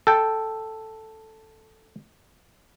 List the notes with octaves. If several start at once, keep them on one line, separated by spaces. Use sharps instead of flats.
A4 G5